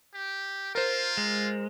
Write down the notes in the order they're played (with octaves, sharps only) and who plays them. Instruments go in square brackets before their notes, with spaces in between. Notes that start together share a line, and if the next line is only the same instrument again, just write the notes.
[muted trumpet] G4
[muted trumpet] F4 [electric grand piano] A#4 C5
[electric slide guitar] G#3